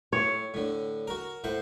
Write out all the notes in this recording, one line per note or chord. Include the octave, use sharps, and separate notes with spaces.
A2 C#5
A2 D3
F#4 A#4
A2 C5 F#5